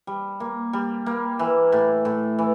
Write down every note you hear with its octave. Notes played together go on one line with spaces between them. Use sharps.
G3
A#3
G3
A#3
E3
A2
A2
E3